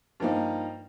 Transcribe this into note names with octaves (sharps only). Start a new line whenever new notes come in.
G2 F3 A#3 D#4